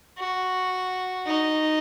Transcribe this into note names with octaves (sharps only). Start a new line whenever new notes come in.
F#4
D#4